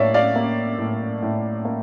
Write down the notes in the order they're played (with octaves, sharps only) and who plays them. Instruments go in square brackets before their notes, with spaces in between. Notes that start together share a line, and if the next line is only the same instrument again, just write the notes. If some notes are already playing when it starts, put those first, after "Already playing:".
Already playing: [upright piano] A2 A#3 C#5 D5 E5 F5
D5 F5
A#3
A2
A2
A#3